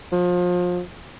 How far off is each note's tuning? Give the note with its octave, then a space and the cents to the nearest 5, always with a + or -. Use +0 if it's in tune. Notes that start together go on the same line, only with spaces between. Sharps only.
F3 +30